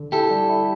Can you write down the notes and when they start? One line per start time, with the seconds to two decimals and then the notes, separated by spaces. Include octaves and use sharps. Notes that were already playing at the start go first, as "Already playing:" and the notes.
Already playing: D3
0.12 E4 G4 A4
0.31 G3
0.49 E4